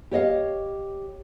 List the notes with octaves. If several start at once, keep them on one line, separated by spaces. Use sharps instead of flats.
G4 C#5 D#5 F5